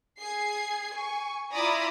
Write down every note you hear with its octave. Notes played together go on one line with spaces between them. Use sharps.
G#4 G#6 C7
G#5 C#6
E4 F4 D5 A#5 B5 D#6